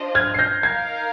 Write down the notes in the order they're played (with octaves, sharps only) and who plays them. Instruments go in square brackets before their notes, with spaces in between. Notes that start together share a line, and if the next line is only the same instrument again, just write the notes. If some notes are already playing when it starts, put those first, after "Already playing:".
Already playing: [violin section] D4 F4 C5 D#5
[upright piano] F6 G#6
C7
G6 A#6
[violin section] D#4 A#4 F5 [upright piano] G#6 C7